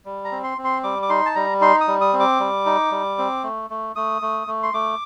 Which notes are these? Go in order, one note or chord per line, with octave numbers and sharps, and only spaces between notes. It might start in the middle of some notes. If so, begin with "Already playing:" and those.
G3
A#5
C4
C6
C4
C6
G3 D6
D6
D#4 C6
A5
G3 A#5
D#4 C6
D#6
G3
D#6
C4
D6
G3
D#4
G3
C4
A3
A3
A3 D#6
A3
A3
C6
A3 D6